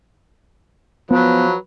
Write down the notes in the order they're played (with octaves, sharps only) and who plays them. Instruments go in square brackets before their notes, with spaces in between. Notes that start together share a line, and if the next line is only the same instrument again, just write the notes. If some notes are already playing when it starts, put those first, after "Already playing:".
[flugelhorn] F3 [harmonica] F#3 [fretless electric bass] B3 [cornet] B4